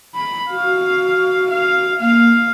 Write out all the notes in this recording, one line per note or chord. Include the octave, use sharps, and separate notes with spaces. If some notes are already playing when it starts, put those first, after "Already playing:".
B5
F#4 F5
F5
A#3 F5